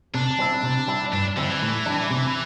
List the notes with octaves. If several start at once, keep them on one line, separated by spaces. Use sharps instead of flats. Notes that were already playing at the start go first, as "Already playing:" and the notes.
C3 D4
G3 C4 E4
C3
G3 E4
G2 D4
D3 G3 C4 E4
E3
A2
G3 D4
C3